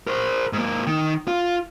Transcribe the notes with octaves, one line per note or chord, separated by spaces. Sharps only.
A#4 C5
G#2 A#3
D#3
F4